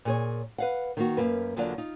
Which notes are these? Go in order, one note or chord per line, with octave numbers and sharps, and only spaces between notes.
A#2 G#4 C#5
B4 F5 F#5
D#3 A#3 F#4
F#2 A#3 B4
E2 D3 F#3 A#3 F4 D5
D#4 F4